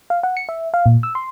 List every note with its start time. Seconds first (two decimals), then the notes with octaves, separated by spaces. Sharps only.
0.10 F5
0.23 F#5
0.37 C#7
0.49 E5
0.74 F5
0.86 A#2
1.03 E6
1.15 C6